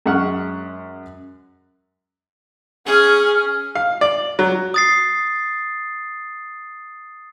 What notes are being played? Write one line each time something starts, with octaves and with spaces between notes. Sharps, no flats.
F#2 G#3 F#5 C#6 F6
C#4 G#4 F6
F5
D5
F#3
D#6 A6 C7